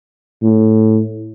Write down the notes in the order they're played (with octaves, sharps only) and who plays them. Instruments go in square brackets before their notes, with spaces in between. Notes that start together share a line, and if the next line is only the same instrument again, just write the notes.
[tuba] A2